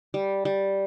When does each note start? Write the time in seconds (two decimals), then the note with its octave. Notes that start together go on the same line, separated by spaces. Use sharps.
0.14 G3
0.45 G3